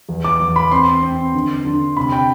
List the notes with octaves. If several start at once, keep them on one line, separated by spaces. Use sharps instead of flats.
E2
D6
E2
B5
C4 C6
C4
D3
D3
C3 B5
G5